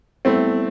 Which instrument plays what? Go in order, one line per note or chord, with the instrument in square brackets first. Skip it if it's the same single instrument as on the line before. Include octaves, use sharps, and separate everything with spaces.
[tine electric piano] G3 B3 E4 [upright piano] A3 C4